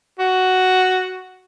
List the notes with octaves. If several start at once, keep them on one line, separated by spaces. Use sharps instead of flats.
F#4